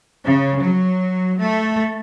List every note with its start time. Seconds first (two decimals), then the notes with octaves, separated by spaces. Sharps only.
0.23 C#3
0.60 F#3
1.39 A3